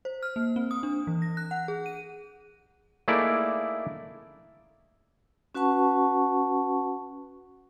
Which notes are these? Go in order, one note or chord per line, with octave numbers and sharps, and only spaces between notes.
C5
F6
A#3
C4
D#6
D4
E3
A#6
F#6
F#5
G#4
D#7
A3 A#3 D#4 E4 G#4 D5
C#4 F#4 B4 F#5 A5 C#6